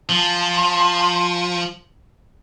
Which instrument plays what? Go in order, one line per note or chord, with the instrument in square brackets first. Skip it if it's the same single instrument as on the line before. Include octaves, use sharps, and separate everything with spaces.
[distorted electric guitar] F3 [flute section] G#5 A5 C6